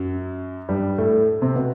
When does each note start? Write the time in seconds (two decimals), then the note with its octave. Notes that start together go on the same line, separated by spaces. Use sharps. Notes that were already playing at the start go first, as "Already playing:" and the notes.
Already playing: F#2 F#3
0.69 G2 G3
0.98 A2 A3
1.41 C3 C4
1.55 B2 B3